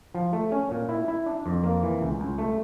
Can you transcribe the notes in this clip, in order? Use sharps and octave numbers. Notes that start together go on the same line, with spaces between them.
F3
A3
C#4
A#2
E4
E4
D4
F2
A#3
E3
C#2
C#2
A3